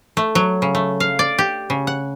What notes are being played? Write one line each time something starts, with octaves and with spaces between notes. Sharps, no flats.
A3
F#3
C#3
A3
F5
D5
G4
C#3
F#5